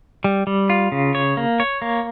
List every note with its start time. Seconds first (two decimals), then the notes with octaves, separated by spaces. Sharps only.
0.24 G3
0.47 G3
0.70 F4
0.92 C#3
1.15 C#5
1.37 A#3
1.60 C#5
1.82 A#3